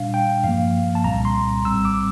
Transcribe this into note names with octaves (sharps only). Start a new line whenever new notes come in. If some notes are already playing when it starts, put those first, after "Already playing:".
Already playing: A#2 G3 D4 F5
G5
G2 F3 A#3 F5
A5
C2 A#2 G3 C4 A#5
C6
A#1 A2 G3 C4 E6
D6